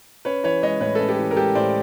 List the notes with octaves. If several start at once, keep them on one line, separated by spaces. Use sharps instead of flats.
C#4 B4 C#5
E3 B4 C#5
G#3 C#5 D#5
A2 B4 C#5
C#4 A4 B4
G4 A4
E3
A#4
G#3 G4 A4
A2 C5 D5